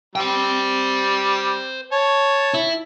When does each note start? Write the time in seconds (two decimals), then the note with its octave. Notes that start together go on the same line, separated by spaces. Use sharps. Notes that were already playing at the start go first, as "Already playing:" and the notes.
0.16 G3 C5 G5
1.92 C#5 A5
2.54 E4